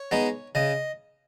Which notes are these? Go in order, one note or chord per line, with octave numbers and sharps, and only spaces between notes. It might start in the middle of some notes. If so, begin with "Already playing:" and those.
Already playing: C#5
G#3 B3 D#4
C#3 D#5